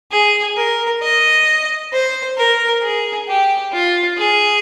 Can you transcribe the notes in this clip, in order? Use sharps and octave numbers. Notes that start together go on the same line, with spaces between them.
G#4
A#4
D#5
C5
A#4
G#4
G4
F4
G#4